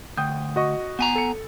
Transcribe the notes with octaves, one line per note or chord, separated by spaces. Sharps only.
D2 G5 D#6 G6
F#4 D#5 C#6
B3 G#5 A#5
A4 C#7